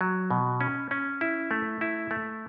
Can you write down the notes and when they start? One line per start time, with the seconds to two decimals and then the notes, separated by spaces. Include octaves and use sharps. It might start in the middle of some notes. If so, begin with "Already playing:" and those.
0.01 F#3
0.31 B2
0.61 C#4
0.91 C#4
1.21 E4
1.51 A3
1.81 E4
2.11 A3